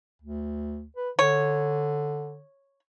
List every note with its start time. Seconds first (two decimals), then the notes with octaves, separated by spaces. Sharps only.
0.22 D2
0.96 B4
1.19 D3 C#5